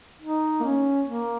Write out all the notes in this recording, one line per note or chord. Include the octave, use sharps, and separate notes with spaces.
D#4
A#3
C#4
A#3